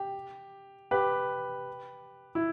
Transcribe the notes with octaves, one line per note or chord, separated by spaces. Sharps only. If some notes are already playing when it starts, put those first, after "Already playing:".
Already playing: G4
G4 B4
E4